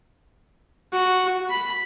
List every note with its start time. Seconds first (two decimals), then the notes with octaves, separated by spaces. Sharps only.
0.93 F#4
1.50 B5